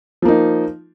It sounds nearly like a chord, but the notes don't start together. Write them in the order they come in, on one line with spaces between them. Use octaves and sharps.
F3 A#3 D#4